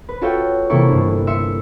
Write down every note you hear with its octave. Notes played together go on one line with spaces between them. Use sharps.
B4
F4 F#4 A4 C#5 E5 G5
C3 E3 A#3 E4 A4 C#6
G1 D4
E5 C6 C#7